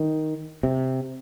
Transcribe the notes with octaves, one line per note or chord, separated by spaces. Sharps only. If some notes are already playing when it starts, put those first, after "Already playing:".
Already playing: D#3
C3